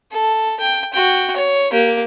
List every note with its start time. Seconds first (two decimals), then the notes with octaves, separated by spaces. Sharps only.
0.12 A4
0.60 G5
0.93 F#4 G5
1.36 C#5
1.72 A#3 G4